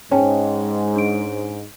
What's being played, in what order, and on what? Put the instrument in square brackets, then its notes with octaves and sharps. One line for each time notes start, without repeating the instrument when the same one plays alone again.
[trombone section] G#2 [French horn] G#3 [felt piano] C#4 [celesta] C5 G5 A5
[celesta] D4 D7